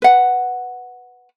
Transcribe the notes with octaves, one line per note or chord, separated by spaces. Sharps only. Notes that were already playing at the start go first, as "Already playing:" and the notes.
B4 F#5